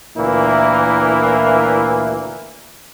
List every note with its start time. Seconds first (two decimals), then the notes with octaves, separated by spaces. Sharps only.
0.17 D2 A#2 E3 A#3 E4